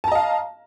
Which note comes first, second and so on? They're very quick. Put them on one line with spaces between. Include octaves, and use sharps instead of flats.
A5 A#5 D#5 F5